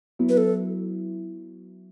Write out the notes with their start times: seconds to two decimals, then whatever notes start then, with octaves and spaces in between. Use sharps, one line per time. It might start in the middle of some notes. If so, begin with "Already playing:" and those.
0.19 F#3 B3 E4
0.29 B4
0.37 A4